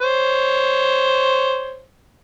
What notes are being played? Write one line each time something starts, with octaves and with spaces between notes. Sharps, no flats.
C5 C#5